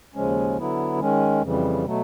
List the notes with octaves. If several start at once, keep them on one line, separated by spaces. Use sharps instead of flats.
D#2 C#3 F3 G#3 C#4
D3 F#3 B3 E4
D#3 G#3 C#4
F2 C#3 E3 G3
B2 F#3 A3